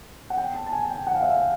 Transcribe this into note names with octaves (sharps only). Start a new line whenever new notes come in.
F#5
G5
A5
A5
G#5
G5
F#5
F5
E5
F5